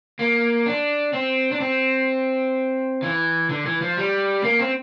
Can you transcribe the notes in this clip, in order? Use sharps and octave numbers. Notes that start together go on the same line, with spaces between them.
A#3
D4
C4
D4
C4
E3
D3
E3
F3
G3
A#3
C4